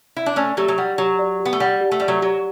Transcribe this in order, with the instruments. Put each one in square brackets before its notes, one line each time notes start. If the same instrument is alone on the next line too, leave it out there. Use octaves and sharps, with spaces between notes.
[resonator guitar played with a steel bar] E4
D4
[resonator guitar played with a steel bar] A3 C#4 [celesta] D5
[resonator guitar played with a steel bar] F#3 A3 [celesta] G4
[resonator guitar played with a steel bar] F#3
[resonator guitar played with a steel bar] G3 [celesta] F#5
[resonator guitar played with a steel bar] F#3 [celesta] G4
[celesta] D5
G4
[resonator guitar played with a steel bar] B3
A3
[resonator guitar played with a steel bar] G3 [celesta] F#5
[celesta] G4
[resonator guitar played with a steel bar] A3
[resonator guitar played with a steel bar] G3 [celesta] D5
[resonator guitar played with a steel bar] F#3 A3
[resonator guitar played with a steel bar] F#3 [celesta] G4